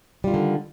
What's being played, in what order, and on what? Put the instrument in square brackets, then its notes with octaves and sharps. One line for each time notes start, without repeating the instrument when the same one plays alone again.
[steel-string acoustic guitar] G3
F4
D#3
D3